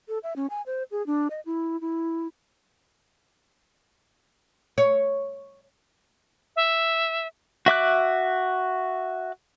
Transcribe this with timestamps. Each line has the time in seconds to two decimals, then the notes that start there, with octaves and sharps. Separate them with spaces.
0.08 A4
0.23 E5
0.36 C#4
0.50 G#5
0.66 C5
0.91 G#4
1.07 D4
1.30 D#5
1.46 E4
1.81 E4
4.78 C#5
6.56 E5
7.66 F#4 E5 D6 F#6